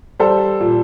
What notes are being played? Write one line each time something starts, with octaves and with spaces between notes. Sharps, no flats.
G3 A4 C5
A#2